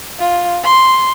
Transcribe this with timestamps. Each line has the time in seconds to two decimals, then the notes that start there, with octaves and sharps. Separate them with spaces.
0.19 F4
0.64 C6